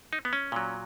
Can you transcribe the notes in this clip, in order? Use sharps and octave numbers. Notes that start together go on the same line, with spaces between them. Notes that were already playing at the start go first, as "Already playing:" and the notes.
D#4
B3
C#4
A#2 F#3